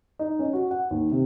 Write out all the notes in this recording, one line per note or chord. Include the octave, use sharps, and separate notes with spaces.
D#4
C#4
F#4
F#5
D#2
C3